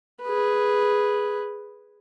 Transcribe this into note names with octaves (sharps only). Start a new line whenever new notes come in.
G#4 B4